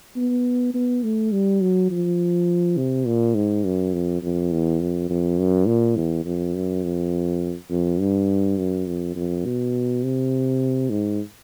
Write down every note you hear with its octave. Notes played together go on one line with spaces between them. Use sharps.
B3
B3
A3
G3
F#3
F3
C3
A#2
G#2
F#2
F2
F2
E2
F2
F2
F#2
A#2
E2
F2
F#2
F2
F2
G2
F#2
F2
F2
B2
C3
G#2